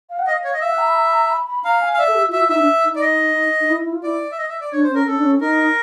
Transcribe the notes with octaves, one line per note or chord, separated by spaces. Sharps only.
F5
F#5
D#5 F5
C#5
D#5
E5 F5
F#5
A#5
B5
A#5
B5
A#5
A#5
B5
B5
F5 A#5
G#5
F5
D5 E5
A4
G4
F4
F#4 E5
F4
D#4 E5
D4
D#4
D5
D#5
D#4
E4
E4
F4
E4 D5
E5
D#5
E5
D5
D4 C#5
C5
C#4
A#4
C#4 A4
D4
C#4
D#4 A#4